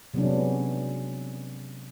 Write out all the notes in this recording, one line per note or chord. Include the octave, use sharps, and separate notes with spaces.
C3 F#3 G#3 B3 C#4 D4